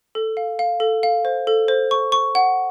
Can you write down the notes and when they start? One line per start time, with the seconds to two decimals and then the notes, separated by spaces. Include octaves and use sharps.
0.15 A4
0.37 F5
0.59 F5
0.80 A4
1.03 F5
1.25 C5
1.47 A4
1.68 C5
1.91 C#6
2.12 C#6
2.35 F#5